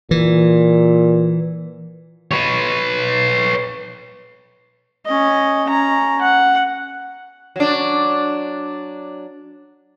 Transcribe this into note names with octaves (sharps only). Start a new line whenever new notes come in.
A#2 E3
B4 C#5
C#4 D#5
C#4 A#5
F#5
F#3 D4